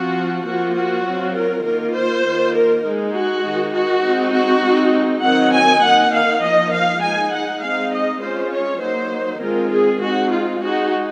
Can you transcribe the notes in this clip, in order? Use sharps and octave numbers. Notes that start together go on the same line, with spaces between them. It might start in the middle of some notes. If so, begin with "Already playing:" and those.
Already playing: F3 C4 F4 F#4
F3 A#3 F4 F#4
F#4
F#3 C4 F4
A#4
D#3 A#3 F4 A#4
C5
D#3 A#3 F4
A#4
G#3 D#4
F#4
D#3 G#3 D#4
F#4
G#3 C4 D#4
F#4
G#3 C4 D#4
D#3 F#3 C4 D#4 F#5
G#5
D#3 A#3 D#4 F#5
F5
F3 A#3 D#4 D#5
F5
G#3 D#4 G#5
F#5
G#3 C4 D#4 F5
D#5
G#3 C#4 F4 C5
C#5
F#3 A#3 D#4 C5
D#3 G#3 C4 F4 A#4
G#4
G#3 C4 D#4 F#4
F4
G#3 D#4 F#4